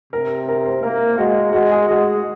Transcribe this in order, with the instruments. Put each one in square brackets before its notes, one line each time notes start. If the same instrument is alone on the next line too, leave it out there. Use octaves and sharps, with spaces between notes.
[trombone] C3 [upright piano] A#4
[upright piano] A#4
C5
[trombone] A#3 [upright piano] A#4
[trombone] G#3 [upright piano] F#4
[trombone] G#3 [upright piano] F#4
[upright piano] G#4
[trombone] G#3 [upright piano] F#4